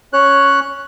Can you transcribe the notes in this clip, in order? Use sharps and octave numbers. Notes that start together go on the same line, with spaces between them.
C#4 C#5 F#6